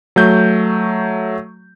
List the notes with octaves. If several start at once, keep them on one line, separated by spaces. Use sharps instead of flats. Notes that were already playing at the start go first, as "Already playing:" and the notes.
F#3 A3 G6